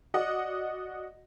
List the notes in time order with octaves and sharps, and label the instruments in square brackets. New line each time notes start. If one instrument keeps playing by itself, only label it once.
[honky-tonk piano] F#4 D5 D#5 F#5